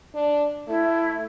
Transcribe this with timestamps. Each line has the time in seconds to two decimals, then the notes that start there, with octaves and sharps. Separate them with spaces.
0.15 D4
0.68 A3 E4